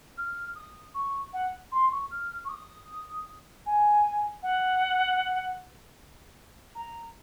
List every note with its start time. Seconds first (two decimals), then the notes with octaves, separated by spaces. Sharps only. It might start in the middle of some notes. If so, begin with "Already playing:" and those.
0.17 F6
0.55 D#6
0.94 C#6
1.33 F#5
1.71 C6
1.91 C#6
2.10 F6
2.44 C#6
2.49 D#6
3.66 G#5
4.42 F#5
6.75 A#5